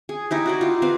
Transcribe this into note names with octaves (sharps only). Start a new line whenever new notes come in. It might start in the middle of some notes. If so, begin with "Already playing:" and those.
G#4
D#4 E4 G4
F#4 D5 D#5
F4 G4
C4 B4 F5